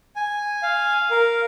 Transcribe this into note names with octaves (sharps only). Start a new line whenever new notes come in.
G#5
F5
A#4